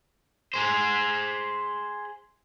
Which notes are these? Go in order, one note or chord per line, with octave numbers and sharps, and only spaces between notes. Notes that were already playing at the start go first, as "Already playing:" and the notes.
G#4 C5